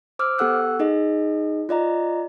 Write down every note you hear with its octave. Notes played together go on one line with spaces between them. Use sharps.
C5 D6 E6 F6
B3 G4 A4 F#5 E6 F#6
D#4 G#4 D#5
F4 D5 D#5 A#5